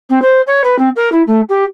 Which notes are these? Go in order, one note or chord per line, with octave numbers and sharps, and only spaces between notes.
C4
C5
C#5
B4
C4
A#4
E4
A3
G4